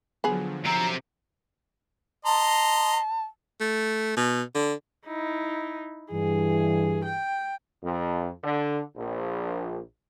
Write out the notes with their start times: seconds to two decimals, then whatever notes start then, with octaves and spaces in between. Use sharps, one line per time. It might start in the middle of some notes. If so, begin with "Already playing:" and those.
0.24 D3 F3 F#3 B3 G#4
0.66 C3 C4 A#5
2.25 D#5 A5 A#5 C6
3.60 A3
4.17 B2
4.55 D3
5.07 D#4 E4
6.12 G2 E3 G#4
7.04 G5
7.84 F2
8.44 D3
8.97 A#1